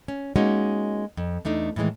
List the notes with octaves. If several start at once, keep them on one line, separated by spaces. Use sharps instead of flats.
C#4
G#3 A#3 C#4 D#4 F#4
F2
E2 A3 D4 D#4
A2 D#3 E3 G#3